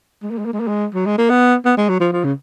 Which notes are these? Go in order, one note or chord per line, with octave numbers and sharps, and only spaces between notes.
G#3
A#3
G#3
A#3
G#3
A#3
G#3
F#3
G#3
A#3
B3
B3
G#3
F#3
F3
F3
C#3